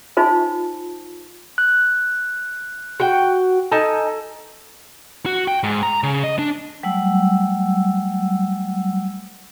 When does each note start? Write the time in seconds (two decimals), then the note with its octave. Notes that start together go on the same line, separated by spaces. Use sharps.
0.17 D#4 F4 C5 G#5
1.58 F#6
3.00 F#4 G5
3.72 D#4 A4 G#5 A5
5.26 F#4
5.48 G5
5.63 G#2
5.83 A#5
6.03 C#3
6.24 D#5
6.39 D4
6.83 F#3 G3 A3 F#5 E6